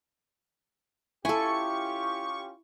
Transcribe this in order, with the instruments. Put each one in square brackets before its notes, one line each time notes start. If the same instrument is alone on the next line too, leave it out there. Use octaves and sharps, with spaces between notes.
[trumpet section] C#4 F4 G4 [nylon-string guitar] E4 [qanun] A4 G#5 [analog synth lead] C#6